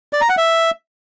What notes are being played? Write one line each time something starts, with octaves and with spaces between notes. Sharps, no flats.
D5
A#5
F#5
E5